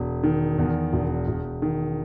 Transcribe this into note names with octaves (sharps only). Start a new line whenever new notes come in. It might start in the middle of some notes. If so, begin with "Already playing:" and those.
Already playing: E1
D#3
E2
E1
E1
D#3